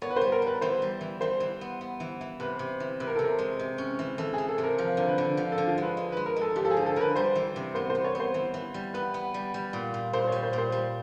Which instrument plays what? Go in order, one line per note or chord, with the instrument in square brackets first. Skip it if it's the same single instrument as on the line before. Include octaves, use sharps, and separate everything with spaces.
[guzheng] B3 [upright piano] C#5
[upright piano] B4
[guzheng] G3 [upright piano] C5
[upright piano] A#4
[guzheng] G3 [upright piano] B4
[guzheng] E3 [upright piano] C5
[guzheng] G3
E3
[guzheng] E3 [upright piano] C5
[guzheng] E3
B3
B3
E3
E3
[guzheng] C3 [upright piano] B4
[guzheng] C3
E3
[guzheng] C3 [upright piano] B4
[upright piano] A#4
A4
[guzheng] C3 [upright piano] A#4
[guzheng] G#3
C3
C#4
E3
[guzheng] E3 [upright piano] A4
[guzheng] E3 [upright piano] G#4
[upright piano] A4
[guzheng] C3
[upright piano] A#4
[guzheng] F3 [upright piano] A#4
[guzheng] D3
[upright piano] B4
[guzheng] D3
F3
[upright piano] A4
[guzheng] D3
[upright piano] F4
[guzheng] G#3 [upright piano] B4
[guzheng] G#3
[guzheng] G#3 [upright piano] B4
[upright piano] A#4
[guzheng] G#3 [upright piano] A4
[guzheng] F3 [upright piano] G4
[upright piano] A4
G#4
[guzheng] D3
[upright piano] A4
[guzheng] D3 [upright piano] A#4
[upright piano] B4
[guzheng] G3 [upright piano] C5
[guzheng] E3
C3
[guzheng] B3 [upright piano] C5
[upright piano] C5
[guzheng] B3
[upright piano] C#5
[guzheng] B3
[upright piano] C5
[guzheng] E3
E3
G3
[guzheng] B3 [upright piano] B4
[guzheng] B3
G3
G3
A#2
A#2
[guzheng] A#2 [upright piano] C5
[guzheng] G3 [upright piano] C#5
[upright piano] C5
[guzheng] A#2
[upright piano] C5
[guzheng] G3